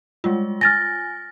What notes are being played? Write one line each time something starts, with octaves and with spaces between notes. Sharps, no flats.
G3 G#3 F4
G#5 F6 A6 A#6